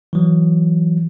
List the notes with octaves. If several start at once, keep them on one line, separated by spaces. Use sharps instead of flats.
E3 F#3